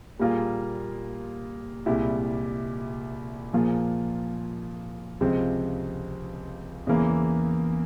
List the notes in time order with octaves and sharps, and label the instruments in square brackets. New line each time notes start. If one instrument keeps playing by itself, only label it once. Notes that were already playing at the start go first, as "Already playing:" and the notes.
[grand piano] A#2 G3 A#3 F4 G#4
C2 A#2 G#3 E4 G4
A#2 F3 A#3 F4 G#4
C#2 C3 F3 G#3 C4
E2 C#3 E3 A#3